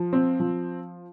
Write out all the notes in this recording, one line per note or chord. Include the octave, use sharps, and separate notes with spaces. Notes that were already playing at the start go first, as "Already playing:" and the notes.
Already playing: F3
C4
F3